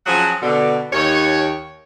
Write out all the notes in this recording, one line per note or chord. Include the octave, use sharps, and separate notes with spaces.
F3 F#3 C#4 G#4 C#5 F#5
B2 D3
D#2 C#5